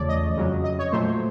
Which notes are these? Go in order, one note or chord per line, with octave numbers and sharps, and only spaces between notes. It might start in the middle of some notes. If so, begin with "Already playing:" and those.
Already playing: E2 C#3 F3 A3 C#5 D5
D#5
F2 C#3 F#3
D#5
C#5
A#2 F#3 A3 C5